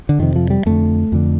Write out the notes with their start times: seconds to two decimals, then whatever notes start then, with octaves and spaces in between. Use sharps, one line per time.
0.09 D3
0.19 F2 C3 D#3
0.36 F3
0.50 G3
0.66 F2 D3 A3
1.12 F2 D3